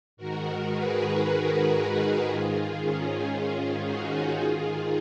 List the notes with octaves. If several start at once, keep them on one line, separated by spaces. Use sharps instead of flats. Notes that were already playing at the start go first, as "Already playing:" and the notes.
G#2 D#3 F#4 A#4
G#4 B4
F#4 A#4
G#2 D#3 F4 G#4
C#4 F4
C#4 F4
D#4 F#4
G#2 D#3 F4 G#4